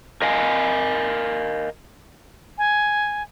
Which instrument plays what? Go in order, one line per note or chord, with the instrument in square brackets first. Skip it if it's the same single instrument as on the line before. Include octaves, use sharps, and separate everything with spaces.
[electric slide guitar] A#4 D#5 F5 G#5
[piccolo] G#5